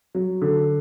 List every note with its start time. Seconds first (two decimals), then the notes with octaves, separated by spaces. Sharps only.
0.15 F#3
0.42 D3